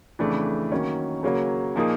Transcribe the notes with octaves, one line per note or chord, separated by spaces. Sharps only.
F2 C#3 E3 A3 D4
D#3 F#3 A#3 C#4
C#3 F#3 A#3 C#4
A#2 F3 A#3 D#4 G#4